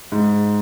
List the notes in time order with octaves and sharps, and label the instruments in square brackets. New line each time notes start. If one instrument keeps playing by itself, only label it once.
[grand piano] G#2